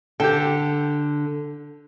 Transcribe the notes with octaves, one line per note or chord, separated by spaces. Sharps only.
D3 G4 A4 G5